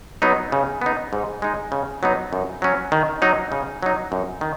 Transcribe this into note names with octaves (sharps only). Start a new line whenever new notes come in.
F#3 B3 D#4
C#3
B3 D#4
G#2
G#3 D#4
C#3
F#3 B3 D#4
F#2
F#3 C#4
D#3
F#3 D#4
C#3
F#3 D#4
F#2
D#3